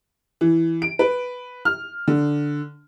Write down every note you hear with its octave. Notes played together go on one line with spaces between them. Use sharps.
E3
D7
B4
F6
D3